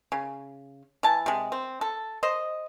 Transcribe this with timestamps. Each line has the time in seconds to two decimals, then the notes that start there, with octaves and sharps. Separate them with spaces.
0.12 C#3
1.03 E3 A5
1.26 C3 G#3
1.52 C4
1.81 A4
2.23 C5 D#5